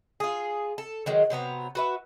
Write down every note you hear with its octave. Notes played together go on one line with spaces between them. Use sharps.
F4 G#4
A4
D#3 F#3 G#3
C3 F#3 B3 A#5
F#4 B4 E5